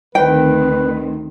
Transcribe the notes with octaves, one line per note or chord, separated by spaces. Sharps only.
D2 D#3 C4 B4 G5